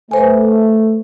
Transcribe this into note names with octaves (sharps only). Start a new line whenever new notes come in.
A3 B4 C5 G#5